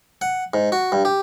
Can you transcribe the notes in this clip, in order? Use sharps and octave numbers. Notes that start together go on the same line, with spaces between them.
F#5
G#2
F#4
G2
G4